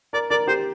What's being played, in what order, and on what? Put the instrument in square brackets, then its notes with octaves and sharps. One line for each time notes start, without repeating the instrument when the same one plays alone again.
[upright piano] A#4 [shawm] D5
[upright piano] A#4 [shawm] D5
[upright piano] G4 [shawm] C5